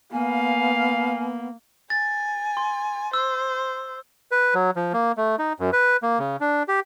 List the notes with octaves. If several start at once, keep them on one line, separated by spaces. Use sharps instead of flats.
A#3 B3 F5 G#5
G#5 A6
C6
C5 E6
B4
F#3
F3
A#3
A3
D#4
F#2
B4
A#3
C#3
D4
G4